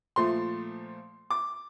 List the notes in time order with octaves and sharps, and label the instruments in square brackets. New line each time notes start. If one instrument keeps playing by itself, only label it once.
[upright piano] A#2 F3 A3 C6
D6